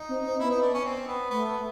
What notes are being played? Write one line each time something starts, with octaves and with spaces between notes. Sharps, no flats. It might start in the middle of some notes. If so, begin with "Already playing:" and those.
Already playing: D#4
C4
C4
B3 E4
D#4
D4
C#4
C4
B3
A3 B3
B3